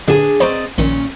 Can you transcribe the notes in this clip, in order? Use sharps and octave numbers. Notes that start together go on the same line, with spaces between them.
A#2 D3 D4 G4 G#4
C4 C5 D5 D#5 A#5 C#6
A#1 A#2 D#3 C#4